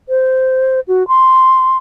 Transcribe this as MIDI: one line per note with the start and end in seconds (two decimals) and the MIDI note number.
0.09 0.80 72
0.88 1.06 66
1.08 1.77 84